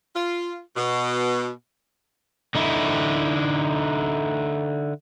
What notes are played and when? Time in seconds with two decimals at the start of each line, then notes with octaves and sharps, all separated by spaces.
0.15 F4
0.76 B2
2.55 D3 D#4 E4